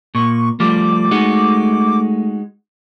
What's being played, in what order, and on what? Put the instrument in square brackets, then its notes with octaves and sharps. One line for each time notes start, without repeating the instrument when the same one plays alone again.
[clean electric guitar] A#2 [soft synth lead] C#6
[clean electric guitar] F3 G3 [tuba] A3 [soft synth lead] D6
[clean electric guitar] G#3 D#4 F#4